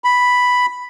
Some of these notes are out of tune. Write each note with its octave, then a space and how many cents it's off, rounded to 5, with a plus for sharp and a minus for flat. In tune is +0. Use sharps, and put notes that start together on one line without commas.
B5 +0